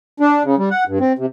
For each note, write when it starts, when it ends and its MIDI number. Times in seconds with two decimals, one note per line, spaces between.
0.20 0.43 62
0.44 0.55 49
0.58 0.69 55
0.71 0.84 78
0.88 0.99 43
1.00 1.13 60
1.19 1.26 48